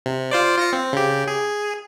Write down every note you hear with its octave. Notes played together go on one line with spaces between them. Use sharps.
C3
F4 C5 D5
F4 A#6 C#7
C4
C#3 G4
G#4